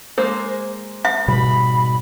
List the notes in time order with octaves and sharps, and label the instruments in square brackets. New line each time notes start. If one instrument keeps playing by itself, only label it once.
[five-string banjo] G#3 A#3 C5
[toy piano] E5
[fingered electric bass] G#2 B2 G3 [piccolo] B5